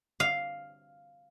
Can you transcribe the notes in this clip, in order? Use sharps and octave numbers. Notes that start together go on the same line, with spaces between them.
F5